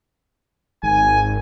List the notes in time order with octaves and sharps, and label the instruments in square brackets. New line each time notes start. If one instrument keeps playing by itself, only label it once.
[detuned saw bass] G#1 [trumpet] G#5